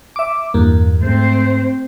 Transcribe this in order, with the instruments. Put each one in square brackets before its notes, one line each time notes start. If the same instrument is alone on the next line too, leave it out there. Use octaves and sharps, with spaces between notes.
[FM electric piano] E5 D6
E2 G2 A#3
[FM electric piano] G#2 [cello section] A3 C4 C5